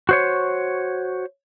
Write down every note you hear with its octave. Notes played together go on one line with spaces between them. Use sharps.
F#4 C5 C#5